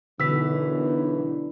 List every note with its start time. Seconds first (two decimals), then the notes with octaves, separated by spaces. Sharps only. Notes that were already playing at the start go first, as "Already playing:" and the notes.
0.20 B1 F#2 D3 E3 E6 B6